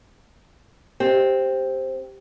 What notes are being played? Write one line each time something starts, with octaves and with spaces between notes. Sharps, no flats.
C4 G4 D#5